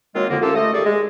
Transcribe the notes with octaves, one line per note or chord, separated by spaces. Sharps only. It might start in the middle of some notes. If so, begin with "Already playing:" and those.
D#3 F#3 G#3 A#3 C4 F4
F2 D3 A#3
A3 A#3 C#4 F4 G4 A4
A3 D#5
D#3 G3 G#4 A4 D5
G#3